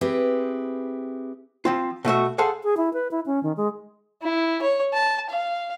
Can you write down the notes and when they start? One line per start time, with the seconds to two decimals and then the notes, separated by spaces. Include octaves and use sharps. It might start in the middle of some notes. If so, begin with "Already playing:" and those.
0.01 C4 E4 G4 G#4 B4
1.65 F3 C4 F4
2.05 B2 A3 F#4 E5
2.38 G#4 A4 C5 F5 F#5
2.64 G#4
2.77 E4
2.94 B4
3.11 E4
3.26 C#4
3.43 D#3
3.57 G#3
4.22 E4
4.62 C#5
4.93 A5
5.29 F5